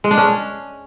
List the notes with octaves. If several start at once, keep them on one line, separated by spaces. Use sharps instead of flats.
G#3
D4
C#4